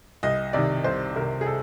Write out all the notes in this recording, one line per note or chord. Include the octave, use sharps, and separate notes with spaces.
C2 D#5
C3 D#3 D5
C2 C5
C3 D#3 A#4
G#4
A4